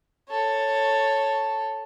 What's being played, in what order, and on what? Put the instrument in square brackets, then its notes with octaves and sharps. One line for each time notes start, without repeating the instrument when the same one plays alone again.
[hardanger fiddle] A4 C#5